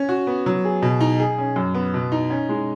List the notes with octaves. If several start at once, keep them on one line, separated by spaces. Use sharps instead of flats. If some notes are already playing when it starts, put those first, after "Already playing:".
Already playing: C#4
F#4
B3
F#3
G#4
B2
D#4
G#4
C#4
F#2
B3
B2
D#4
C#4
G#3